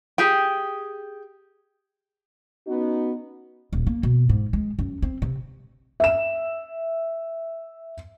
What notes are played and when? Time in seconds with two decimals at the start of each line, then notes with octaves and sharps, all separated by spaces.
0.18 G4 G#4 G5
2.67 B3 C#4 D#4 F#4
3.73 D#1
3.87 A#3
4.03 B2
4.29 G#2
4.53 G#3
4.79 F#2
5.02 C4
5.22 C3
6.00 E5 E7